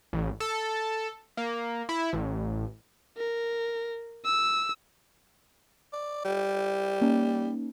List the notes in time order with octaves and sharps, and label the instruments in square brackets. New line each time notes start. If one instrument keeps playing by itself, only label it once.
[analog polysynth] A1
A4
A#3
E4
A1
[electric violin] A#4
E6
[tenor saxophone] D5
G3
[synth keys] A#3 C#4 D#4